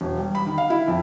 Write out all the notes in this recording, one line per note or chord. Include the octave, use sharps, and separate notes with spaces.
E1
G3
B5
D#3
F5
E4
F2